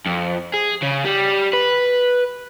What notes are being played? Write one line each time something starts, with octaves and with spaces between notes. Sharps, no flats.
F2
G#4
C#3
G3
B4